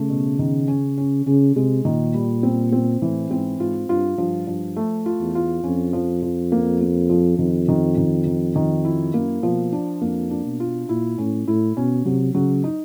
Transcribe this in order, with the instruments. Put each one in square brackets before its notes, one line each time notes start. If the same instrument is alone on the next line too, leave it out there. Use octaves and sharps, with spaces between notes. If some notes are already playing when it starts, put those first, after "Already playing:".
Already playing: [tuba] C#3 [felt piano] A3
[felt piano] B2
D#3
C#4
C#4
[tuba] C#3 [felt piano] C#4
[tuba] C3 [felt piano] G#3
[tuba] A#2 [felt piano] D#3
[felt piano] G3
C4
C4
[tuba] A2 [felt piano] E3
[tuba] G#2 [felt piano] C4
[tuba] G#2 [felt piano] F4
[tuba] G2 [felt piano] F4
[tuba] G2 [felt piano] F3
[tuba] G2 [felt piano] F3
[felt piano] A3
F4
[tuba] E2
[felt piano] F4
[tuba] F2 [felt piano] C#4
[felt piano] F3
F3
A#3
A#3
F3
[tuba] F2 [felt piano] D#3
[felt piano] D#3
D#3
D#3
D#3
E4
[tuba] F#2 [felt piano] A#3
[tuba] B2 [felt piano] F3
[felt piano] D4
[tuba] F2 [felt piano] A#3
[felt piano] D4
[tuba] B2
[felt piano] F4
[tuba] A#2 [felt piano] E4
[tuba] A2 [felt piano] C#4
[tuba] A2 [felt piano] E4
[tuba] B2 [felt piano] C#4
[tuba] C3 [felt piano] F#3
[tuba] C#3 [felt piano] F#3
[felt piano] D#4